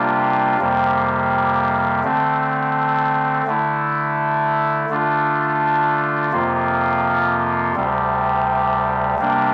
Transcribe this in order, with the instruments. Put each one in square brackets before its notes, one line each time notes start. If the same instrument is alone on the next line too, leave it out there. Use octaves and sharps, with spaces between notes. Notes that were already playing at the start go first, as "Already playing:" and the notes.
Already playing: [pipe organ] C3 G3 A#3 D4 F4
F2 C3 G3 A#3
D3 A3 C4
D3 A3 E4
D3 A3 D4 F4
F2 C3 F3 A#3 F4
D2 C3 G3
C3 G3 A#3 D4